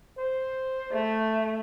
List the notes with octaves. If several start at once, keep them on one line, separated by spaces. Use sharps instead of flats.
C5
A3